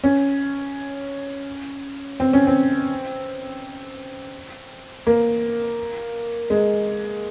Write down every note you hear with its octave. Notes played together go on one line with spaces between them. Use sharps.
C#4
C4
C#4
C4
A#3
G#3